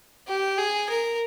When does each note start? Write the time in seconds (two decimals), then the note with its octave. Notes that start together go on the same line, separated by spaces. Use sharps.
0.28 G4
0.58 G#4
0.89 A#4